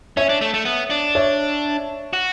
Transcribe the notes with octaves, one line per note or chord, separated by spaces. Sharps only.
C#4 C#5 E5
D4
A3
A3
B3
D4
C#5 E5
F#4